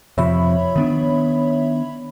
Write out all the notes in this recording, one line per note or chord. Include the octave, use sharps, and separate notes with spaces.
F2 C3 F3 C#5 E5 B5
D#3 B3 D4